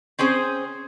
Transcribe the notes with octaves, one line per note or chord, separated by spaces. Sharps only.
C4 C#4 G#4 C5